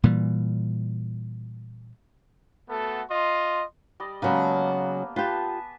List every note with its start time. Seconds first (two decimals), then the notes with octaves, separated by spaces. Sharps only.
0.04 A#2 E3 G3
2.69 A3 B3 F#4 A4
3.10 F4 D#5 C6
4.00 G3 D5 D#5
4.22 C#3 F#3 G#3 A#3 B3 A5
5.16 F4 G4 B4 G#5 A5